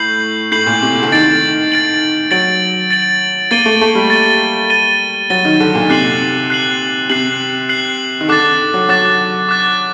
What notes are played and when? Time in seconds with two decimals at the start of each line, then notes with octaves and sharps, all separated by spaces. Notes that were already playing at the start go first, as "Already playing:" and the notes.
Already playing: A2 G6 C7 F#7
0.52 A2 G6 C7 F#7
0.67 A#2
0.82 C3
1.03 D3
1.12 D#3 A6 D7 F#7
1.72 A6 D7 F#7
2.31 F#3 A6 D7 F#7
2.90 A6 D7 F#7
3.51 A#3 A6 D#7 G7
3.66 A3
3.81 A3
3.95 G3
4.10 A6 D#7 G7
4.70 A6 D#7 G7
5.30 F#3 A6 D#7 G7
5.45 D#3
5.60 D3
5.75 A#2
5.90 C3 F#6 C7 F#7
6.50 F#6 C7 F#7
7.09 C3 F#6 C7 F#7
7.69 F#6 C7 F#7
8.21 D#3
8.29 D3 D6 F#6 A6
8.74 F#3
8.89 F#3 D6 F#6 A6
9.49 D6 F#6 A6